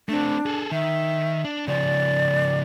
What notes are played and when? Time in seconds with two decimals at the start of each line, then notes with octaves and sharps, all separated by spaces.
0.09 A3 C4 D4
0.46 G#4 A4
0.72 D#3 E5
1.44 D4
1.68 C#3 F3 D5